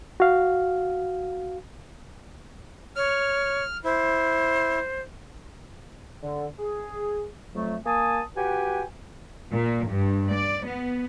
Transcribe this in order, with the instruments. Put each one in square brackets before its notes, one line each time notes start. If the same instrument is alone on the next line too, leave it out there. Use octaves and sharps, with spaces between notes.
[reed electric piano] F#4 F5
[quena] C#5 [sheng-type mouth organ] F6
[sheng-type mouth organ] E4 [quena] C5
[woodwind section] D3
G#4
F2 F#3 A3
A#3 G#5 A5 D#6
F#4 G4 B4 G5 G#5
[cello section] A#2
G2
D5
B3